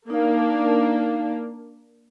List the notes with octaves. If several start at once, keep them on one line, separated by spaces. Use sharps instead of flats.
A#3 D4 D#4 F5